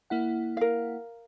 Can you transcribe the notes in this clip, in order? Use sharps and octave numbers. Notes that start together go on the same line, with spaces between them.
A#3 E4 F#5
A#4 F5